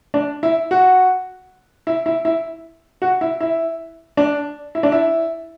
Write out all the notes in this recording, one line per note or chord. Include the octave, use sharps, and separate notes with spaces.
D4
E4
F#4
E4
E4
E4
F#4
E4
E4
D4
E4
D4
E4